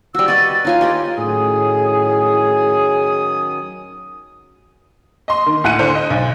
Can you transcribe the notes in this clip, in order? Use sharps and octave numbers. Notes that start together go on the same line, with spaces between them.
G3 F#4 E6
F#4 B4 D#5 A6
D#4 F4 C#5 G#5
G4 B4 D#5
A2 D#3 F#3 C#4 G#4 D#6
D#5 C6
D#3
D2 A2 F#5 F#6 C#7 D#7
D3 C5
D#5
B1